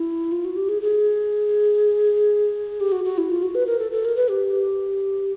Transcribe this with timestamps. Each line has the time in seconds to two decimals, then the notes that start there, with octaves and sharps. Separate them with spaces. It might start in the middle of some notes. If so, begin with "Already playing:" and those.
Already playing: E4
0.32 F4
0.45 F#4
0.56 G4
0.69 G#4
0.82 G#4
2.80 G4
2.92 F#4
3.05 F#4
3.18 E4
3.30 F4
3.43 F#4
3.55 B4
3.66 A#4
3.79 A4
3.92 A4
4.05 A#4
4.16 B4
4.30 G4